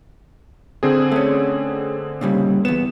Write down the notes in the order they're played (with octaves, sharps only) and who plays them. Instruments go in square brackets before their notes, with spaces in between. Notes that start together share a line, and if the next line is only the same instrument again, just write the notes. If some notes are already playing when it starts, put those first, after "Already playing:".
[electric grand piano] D3 C4 G#4
[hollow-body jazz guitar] A3 C#4
A#2 C#3 G3
[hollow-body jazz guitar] E2 B3 [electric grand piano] E7